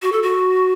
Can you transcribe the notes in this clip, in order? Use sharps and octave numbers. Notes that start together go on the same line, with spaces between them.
F#4
A4
F#4